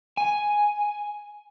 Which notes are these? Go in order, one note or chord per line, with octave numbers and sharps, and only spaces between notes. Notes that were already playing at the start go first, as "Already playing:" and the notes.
G#5